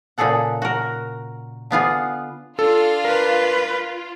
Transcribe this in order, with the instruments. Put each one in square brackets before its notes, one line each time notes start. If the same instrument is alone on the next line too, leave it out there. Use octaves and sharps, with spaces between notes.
[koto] A#2 C#3 G#4 A4 F#5
F#4 A#4
D3 B3 F4 G#4
[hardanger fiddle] D4 F5 [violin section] F4 [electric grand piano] A4
[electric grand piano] A#4 [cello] B4